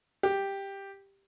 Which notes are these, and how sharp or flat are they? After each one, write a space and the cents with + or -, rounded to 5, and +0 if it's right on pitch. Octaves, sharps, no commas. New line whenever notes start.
G4 +5